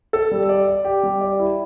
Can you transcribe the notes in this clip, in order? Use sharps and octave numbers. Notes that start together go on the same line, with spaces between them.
A4
G3
D5
D5
G4
G3
D5
E4